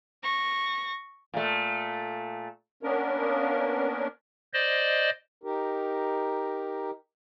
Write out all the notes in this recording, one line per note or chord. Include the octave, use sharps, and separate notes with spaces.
C#6 A#6
A#2 A3
A#3 B3 C#4 D4 A#4
C5 D5 D#5
D#4 G4 A#4